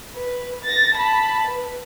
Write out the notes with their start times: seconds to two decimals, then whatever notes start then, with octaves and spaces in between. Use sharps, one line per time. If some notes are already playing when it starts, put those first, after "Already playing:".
0.14 B4
0.64 A6 A#6
0.95 A5 B5
1.47 B4